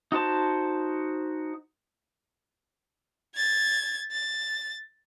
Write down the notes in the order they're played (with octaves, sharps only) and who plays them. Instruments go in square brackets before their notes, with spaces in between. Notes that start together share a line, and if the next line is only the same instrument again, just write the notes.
[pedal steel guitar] D#4 F#4 C5 A5
[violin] G#6 A6
A6